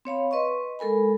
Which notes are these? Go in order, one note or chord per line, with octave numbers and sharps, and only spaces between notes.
C4 C#5 F5 B5
B4 D#5 C6 C#6
G#3 A4 A#4 G#5 B5